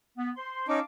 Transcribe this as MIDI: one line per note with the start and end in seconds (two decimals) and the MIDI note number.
0.18 0.31 59
0.37 0.67 72
0.37 0.67 84
0.68 0.79 61
0.68 0.79 63
0.68 0.83 77
0.68 0.83 81
0.68 0.83 86